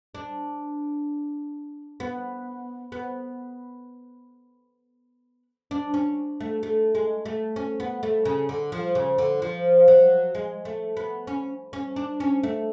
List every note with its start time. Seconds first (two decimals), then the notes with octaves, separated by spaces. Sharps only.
0.15 D4
2.00 B3
2.92 B3
5.71 D4
5.94 C#4
6.40 A3
6.63 A3
6.95 G#3
7.25 A3
7.56 C#4
7.80 B3
8.03 A3
8.25 C#3
8.49 D3
8.72 F3
8.95 C#3
9.18 D3
9.42 F3
9.88 F#3
10.35 G#3
10.65 A3
10.97 B3
11.27 C#4
11.73 C#4
11.96 D4
12.20 C#4
12.43 A3